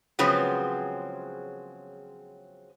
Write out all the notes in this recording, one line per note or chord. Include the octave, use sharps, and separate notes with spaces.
C#3 F3 F#3 G#3 B3 C4